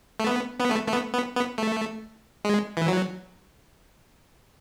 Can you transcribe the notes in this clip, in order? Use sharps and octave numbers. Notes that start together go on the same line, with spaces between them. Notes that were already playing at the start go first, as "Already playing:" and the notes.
A3
B3
B3
A3
A3
B3
B3
B3
A3
G#3
E3
F#3